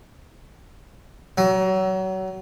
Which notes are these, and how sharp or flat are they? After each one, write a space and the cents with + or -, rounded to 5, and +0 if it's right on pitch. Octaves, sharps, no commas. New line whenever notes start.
F#3 +30